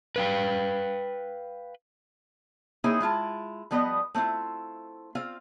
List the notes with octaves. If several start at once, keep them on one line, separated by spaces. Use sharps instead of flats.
B4 F5 G5
A#3 C4 D#4 E4 G#4 C#5
G#3 E4 F4 A5
F3 G3 B3 B4 C5 D#5
A3 C4 E4 F4
C4 F4 F5